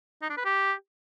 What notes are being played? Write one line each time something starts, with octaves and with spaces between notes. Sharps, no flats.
D#4
D4
B4
G4